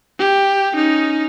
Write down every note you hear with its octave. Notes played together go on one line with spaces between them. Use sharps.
G4
C#4 D#4